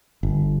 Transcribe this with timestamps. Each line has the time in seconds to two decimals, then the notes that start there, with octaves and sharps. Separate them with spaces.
0.23 G1